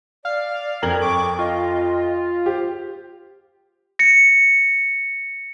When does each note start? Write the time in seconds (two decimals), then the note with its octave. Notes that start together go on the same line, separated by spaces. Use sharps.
0.25 D5 F5
0.82 F2 A#4 G#6 F#7
1.02 C#6 D6
1.39 F4 D#5
2.46 G4 C5
3.99 A#6 C#7